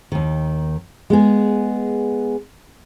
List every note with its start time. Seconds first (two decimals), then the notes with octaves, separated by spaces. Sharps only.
0.12 D#2 D#3
1.10 G#3 B3 G#4